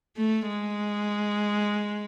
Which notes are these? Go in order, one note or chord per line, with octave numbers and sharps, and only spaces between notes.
A3
G#3